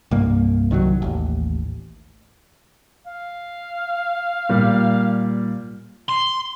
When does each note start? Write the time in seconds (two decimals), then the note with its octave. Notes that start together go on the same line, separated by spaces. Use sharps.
0.11 C2 G2 A#3
0.71 C2 D#3 F3 F#3
1.02 A1 D#2
3.06 F5
4.49 A#2 G3
6.09 C6